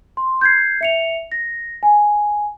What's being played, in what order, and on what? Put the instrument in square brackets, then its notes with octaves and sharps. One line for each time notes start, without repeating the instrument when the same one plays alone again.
[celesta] C6
G6 G#6 C7
E5 C#7 F7
A#6
G#5